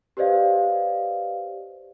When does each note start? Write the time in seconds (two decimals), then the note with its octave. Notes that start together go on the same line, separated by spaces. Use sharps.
0.17 G4 B4 C5 D5 D#5 F5